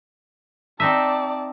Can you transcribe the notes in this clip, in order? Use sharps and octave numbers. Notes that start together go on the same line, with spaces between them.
C4 D#4 D5 E5 A5